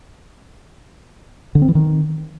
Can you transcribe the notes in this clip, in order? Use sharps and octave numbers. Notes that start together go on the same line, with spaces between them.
D3
C4
E3
D#3